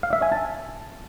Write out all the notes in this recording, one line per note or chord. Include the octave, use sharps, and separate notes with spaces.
F5
E5
G#5
A5